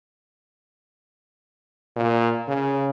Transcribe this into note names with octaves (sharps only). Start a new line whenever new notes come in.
A#2
C#3